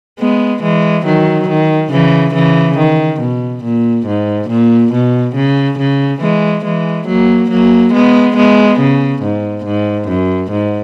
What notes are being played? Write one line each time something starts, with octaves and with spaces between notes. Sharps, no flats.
G#3 B3
E3 G#3
D#3 F#3
D#3
C#3 E3
C#3 E3
D#3
B2
A#2
G#2
A#2
B2
C#3
C#3
E3 G#3
E3 G#3
F#3 A#3
F#3 A#3
G#3 B3
G#3 B3
C#3
G#2
G#2
F#2
G#2